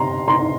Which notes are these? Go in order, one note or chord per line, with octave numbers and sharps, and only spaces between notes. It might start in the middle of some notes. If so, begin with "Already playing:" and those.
Already playing: C3 C4 A#5 C6
C3 A#5 C6